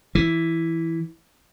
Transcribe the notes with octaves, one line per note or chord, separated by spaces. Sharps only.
E3